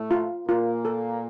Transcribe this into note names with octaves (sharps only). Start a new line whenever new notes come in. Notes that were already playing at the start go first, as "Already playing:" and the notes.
Already playing: A2 A3
F4
A#2 A#3 F4
A4